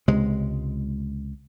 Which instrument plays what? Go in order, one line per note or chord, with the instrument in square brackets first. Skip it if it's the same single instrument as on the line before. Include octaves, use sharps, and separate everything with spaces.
[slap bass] C#2 C3 G#3